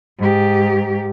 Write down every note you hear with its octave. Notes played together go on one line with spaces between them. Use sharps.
G#2 G4